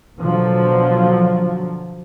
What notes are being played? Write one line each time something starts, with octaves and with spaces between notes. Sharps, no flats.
B2 D3 F3 F#3